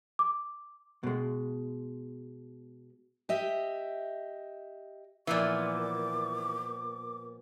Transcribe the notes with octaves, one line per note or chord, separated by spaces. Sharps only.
D6
B2 G#3
G4 D#5 E5
A#2 E3 F3 B3 D6